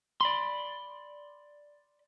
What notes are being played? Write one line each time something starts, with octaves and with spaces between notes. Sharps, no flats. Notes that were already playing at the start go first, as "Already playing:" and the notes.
D5 B5 C6